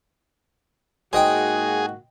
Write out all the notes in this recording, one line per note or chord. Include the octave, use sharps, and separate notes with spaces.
G#2 A#3 F#4 G#4 C5 D#5 G5